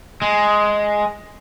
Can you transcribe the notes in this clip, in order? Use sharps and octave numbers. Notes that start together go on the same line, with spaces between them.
G#3